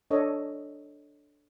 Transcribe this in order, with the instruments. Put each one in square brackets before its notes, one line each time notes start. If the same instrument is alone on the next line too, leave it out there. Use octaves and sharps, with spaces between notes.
[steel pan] D4 A4 C#5 D#5